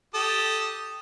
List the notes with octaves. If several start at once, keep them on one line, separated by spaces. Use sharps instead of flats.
G4 A4 D#6